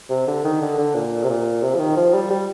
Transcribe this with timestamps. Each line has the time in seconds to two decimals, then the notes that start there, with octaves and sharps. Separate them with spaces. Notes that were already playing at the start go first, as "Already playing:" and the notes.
0.10 C3
0.28 D3
0.44 D#3
0.62 D3
0.78 D3
0.94 A#2
1.24 C3
1.29 A#2
1.62 C3
1.75 F3
1.79 D#3
1.96 F3
2.14 G3
2.31 G3